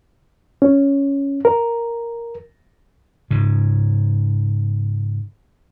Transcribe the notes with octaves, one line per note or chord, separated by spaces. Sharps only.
C#4
A#4
G#2 C#3